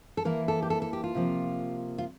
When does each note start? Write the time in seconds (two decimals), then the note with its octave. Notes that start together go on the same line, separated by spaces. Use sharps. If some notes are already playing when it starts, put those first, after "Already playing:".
0.17 A4
0.25 E3 A#3 E4 A#4
0.48 A4
0.63 G4
0.70 A4
0.82 A4
0.93 G4
1.04 F4
1.15 C3 F3 A#3
1.98 F4